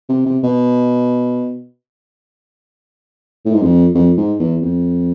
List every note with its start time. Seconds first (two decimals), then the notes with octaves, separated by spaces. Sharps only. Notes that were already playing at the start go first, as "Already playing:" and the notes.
0.09 C3
0.26 C3
0.43 B2
3.46 A2
3.54 G#2
3.62 F2
3.95 F2
4.17 G#2
4.40 E2
4.62 F2